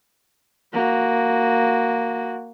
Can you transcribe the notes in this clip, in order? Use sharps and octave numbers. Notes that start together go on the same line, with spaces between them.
A#3 F#4